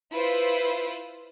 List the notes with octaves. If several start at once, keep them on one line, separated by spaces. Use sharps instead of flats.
E4 F4 B4 C5